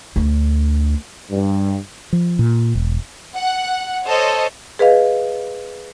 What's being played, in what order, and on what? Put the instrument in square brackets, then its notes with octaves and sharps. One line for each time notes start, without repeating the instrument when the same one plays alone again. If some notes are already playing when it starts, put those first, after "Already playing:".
[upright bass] D2 D3
[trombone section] G2
[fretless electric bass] F3
A#2
E1
[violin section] F#5
A4 C5 C#5 D#5
[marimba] G#4 B4 D#5 F5